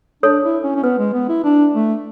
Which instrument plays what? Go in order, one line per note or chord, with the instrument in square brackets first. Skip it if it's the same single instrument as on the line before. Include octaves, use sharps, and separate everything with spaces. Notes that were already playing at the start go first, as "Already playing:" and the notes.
[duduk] D4 [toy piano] A4 C#5
[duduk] E4
C#4
C#4
[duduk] B3 [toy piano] B4
[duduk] G#3
B3
E4
D4
A3